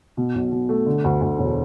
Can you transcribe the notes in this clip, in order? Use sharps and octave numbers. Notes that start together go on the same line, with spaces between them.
B2
B1
B2
A3
D3
D2
D2
E1